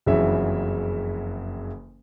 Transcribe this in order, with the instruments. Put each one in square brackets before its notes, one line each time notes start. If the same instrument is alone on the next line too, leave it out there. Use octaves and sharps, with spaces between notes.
[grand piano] F#1 F2 C#3 E3 F#3 E5